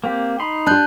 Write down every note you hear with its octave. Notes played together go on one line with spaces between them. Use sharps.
A#3 C4 G4
D#4 B5 C6
D4 G4 A5 F#6 G6